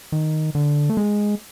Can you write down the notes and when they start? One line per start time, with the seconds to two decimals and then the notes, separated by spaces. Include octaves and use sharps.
0.12 D#3
0.55 D3
0.90 A3
0.97 G#3